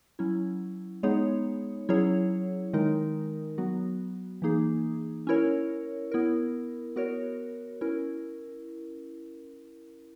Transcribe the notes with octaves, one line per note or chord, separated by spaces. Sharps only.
F#3 C#4 E4
G#3 B3 D#4 G#4 C#5
F#3 C#4 E4 G#4 C#5
D#3 G#3 D#4 A#4
F#3 B3 F#4
E3 A#3 D#4 G#4
C#4 E4 A#4 C#5
B3 E4 A#4
B3 F#4 A#4 C#5
C#4 E4 A#4